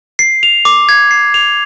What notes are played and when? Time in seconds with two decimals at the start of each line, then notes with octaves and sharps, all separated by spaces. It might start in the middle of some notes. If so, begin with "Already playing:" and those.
0.19 C7
0.43 F7
0.65 D6
0.89 G#6
1.11 C7
1.34 F7